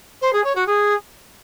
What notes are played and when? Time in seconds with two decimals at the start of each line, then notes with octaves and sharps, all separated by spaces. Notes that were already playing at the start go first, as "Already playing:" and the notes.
0.21 C5
0.33 G#4
0.44 C#5
0.55 F#4
0.67 G#4